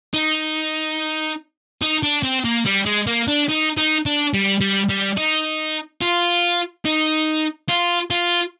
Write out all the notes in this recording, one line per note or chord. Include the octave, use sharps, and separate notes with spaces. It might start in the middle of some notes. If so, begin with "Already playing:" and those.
D#4
D#4
D4
C4
A#3
G3
G#3
A#3
D4
D#4
D#4
D4
G3
G3
G3
D#4
F4
D#4
F4
F4